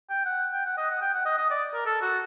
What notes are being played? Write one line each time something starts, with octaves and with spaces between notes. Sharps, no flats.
G5
F#5
G5
F#5
D#5
F#5
G5
F#5
D#5
D#5
D5
A#4
A4
F#4